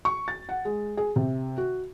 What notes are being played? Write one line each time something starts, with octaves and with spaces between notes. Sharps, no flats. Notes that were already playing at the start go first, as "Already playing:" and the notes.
C#6
A6
F#5
G#3
G#4
C3
F#4